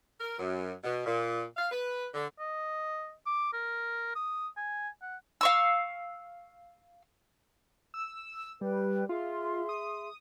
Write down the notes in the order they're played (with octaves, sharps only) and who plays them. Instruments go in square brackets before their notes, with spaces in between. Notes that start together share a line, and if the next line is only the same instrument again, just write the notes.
[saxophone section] A#4
F#2
B2
A#2
F5
B4
D3
[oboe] D#5
D6
A#4
D#6
G#5
F#5
[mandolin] F5 C#6 E6
[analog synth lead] E6
[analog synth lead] G3 [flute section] B4 G5
[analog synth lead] F4 [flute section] G#4 E5 C6
[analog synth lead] D#6